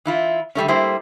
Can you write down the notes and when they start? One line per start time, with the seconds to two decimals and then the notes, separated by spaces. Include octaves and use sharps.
0.05 E3 E4 F4
0.55 D3 G3 A3 C#4
0.68 G3 A3 A#3 E4 C5